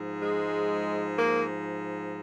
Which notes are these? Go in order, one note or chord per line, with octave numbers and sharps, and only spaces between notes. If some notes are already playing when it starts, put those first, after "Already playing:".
Already playing: G#2 F3
G#3
A#3